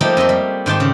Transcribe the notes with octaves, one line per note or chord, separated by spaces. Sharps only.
F3 G3 A3 A#3 D#4 G4
F2 D#5 E5 C6
G3
G#2 D#3 G4 A5 C6
C#3